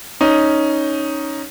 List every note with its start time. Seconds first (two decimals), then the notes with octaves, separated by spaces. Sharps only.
0.21 C#4 D#4